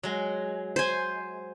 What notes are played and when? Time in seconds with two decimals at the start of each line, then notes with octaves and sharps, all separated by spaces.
0.03 F#3 G#3
0.76 C5 G#5